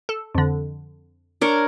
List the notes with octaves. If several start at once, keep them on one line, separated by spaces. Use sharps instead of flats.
A4
F2 D3
D4 A#4 C#5